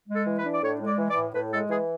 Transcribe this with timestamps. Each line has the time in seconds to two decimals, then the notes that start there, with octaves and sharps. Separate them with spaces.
0.08 G#3
0.14 A4
0.26 E3
0.38 B4
0.44 D4
0.53 D5
0.63 A2 C#5
0.80 G#3
0.86 D5
0.99 E3
1.10 D5
1.16 A2
1.34 A2 B4
1.52 G#3 A4
1.70 E3 G#4